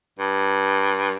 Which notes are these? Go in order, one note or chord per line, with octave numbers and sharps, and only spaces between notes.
G2